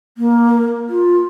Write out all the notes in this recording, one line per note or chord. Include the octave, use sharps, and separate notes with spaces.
A#3
F4